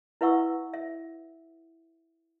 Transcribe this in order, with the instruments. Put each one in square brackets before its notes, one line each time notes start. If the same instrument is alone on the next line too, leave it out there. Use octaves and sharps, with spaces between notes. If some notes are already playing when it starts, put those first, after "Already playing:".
[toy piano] E4 B4 E5 F#5 C#6 E6
E5